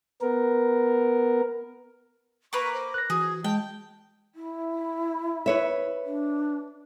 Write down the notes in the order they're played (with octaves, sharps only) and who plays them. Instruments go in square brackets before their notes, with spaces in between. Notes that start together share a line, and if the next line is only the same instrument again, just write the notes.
[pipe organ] B3 A#4
[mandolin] A#3 A#4 B4 [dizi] C#6
[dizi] C5
[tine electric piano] F#6 A#6
[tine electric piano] E3 [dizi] F#4 [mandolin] G#4
[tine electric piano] G#3 [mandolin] G5 [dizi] A5
[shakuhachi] E4
[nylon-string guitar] B4 C#5 E5
[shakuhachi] D4